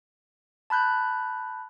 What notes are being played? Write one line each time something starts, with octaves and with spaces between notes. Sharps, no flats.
A5 B5 F#6 G6